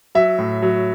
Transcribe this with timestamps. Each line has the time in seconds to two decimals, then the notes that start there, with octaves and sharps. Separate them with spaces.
0.15 F#3 E5
0.39 A2
0.62 F#3